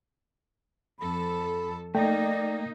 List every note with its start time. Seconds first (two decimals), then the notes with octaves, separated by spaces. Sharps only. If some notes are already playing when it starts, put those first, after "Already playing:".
0.99 F2 A4 B5
1.95 A3 A#3 D#4 D5 G5